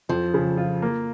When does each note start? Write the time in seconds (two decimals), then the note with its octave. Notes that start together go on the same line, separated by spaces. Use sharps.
0.09 F2 F3
0.34 C#3
0.57 F4
0.82 A#3